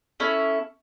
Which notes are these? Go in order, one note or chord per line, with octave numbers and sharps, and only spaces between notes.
C#4 E4 A4